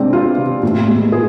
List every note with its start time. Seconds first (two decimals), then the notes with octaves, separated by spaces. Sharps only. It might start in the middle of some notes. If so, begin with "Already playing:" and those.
Already playing: C3 G#3 C4 D4
0.13 B3 F4
0.38 C3
0.63 A2
0.88 G#3
1.12 B3 G#4